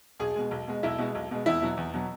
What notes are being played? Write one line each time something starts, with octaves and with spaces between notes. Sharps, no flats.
B1 G#4
B2 G#3
B1
B2 G#3
B1 E4
B2 G#3
B1
B2 G#3
E2 E4
B2 F#3
E2
B2 F#3